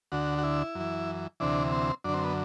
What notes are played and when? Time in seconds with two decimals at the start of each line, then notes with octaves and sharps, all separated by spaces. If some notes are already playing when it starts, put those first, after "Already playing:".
0.12 D2 D3 F#4
0.38 F#4
0.44 E4
0.75 F#2 E3
1.40 D2 C3 E3 D4
1.72 C4
2.04 F#2 D3 D4
2.14 C4
2.24 B3